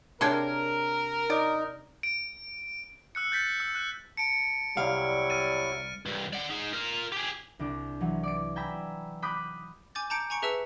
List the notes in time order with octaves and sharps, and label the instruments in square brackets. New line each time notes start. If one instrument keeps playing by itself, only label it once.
[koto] C3 D4 G5 [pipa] G#4 C#5 C6 [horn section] A#4
[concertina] D#4 [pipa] D5
[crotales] D7
E6 F#6 C#7
G6 A6 B6
E6
F#6
[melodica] A5 [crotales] C#7 D7
[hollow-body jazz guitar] C2 F5 [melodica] F#3 E4 [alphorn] G3 [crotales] F6
[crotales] F6 A6 D#7
[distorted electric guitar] C2 G2
D5 F#5
D#4 G#4
F4 A#4
G4 G#4
[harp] C2 D4 D7
E3 F#3
D5 D7
G5 G#5 A#5 B5 E6
B5 D6 D#6 F#6 G6
[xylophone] G#5 D6 G6 A6
A5 A#5 D6 G6 C#7 D7
G#5 A#5 C#6 C#7 D7
G#4 B4 E5 A5 E6 C#7